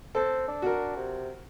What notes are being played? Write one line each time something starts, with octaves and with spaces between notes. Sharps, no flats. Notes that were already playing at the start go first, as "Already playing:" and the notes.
C4 A4
D4
F#4 A#4
C3